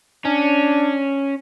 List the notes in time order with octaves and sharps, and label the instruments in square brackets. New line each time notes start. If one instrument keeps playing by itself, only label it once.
[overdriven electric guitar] C#4 [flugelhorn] D4